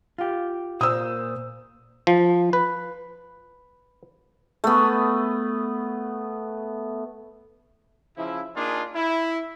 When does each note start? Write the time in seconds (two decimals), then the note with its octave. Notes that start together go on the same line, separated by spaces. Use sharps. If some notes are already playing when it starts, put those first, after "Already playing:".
0.18 F4 G4
0.81 A#2 C5 D#6 E6
2.07 F3
2.53 B4
4.64 A3 B3
8.18 C#3 F3 E4
8.57 A#3 D4 D#4 F4 G#4
8.95 E4